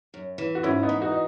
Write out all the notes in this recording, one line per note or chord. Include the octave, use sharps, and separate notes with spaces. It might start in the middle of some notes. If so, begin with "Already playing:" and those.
F#2
E3
F#4
G#2 C#4 E4
B3 D#4
E3
D#4 F#4
D#4